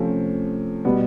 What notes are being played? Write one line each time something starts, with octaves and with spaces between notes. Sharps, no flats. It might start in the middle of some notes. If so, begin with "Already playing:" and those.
Already playing: C3 F3 A3 C#4
B2 G3 B3